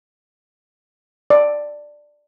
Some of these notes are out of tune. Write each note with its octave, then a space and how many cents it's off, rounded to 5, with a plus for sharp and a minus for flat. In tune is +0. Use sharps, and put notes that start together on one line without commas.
D5 +5